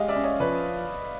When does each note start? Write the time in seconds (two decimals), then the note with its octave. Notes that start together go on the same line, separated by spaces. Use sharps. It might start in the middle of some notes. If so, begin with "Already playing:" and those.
Already playing: G#3 G4 D#5 F5
0.08 D5 E5
0.16 C#4
0.24 C#5 D#5
0.40 F3 B4 C#5